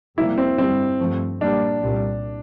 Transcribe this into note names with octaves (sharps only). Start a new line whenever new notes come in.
F2 C3 G3 A#3 E4
C4
G2 D3 G3 C4
G2 F3 A3 C4
A#2 G3 A#3 D4
C2 A#2 G3